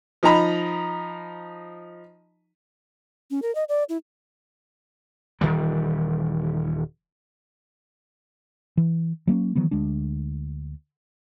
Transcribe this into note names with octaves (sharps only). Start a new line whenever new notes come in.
F3 D#4 D#5 A#5 B5
C#4
A#4
D#5
D5
E4
D#1 D#3 E3 G3
E3
F#3 A#3 B3 C#4
D#3 E3 F#3 B3
D2 G#3 D4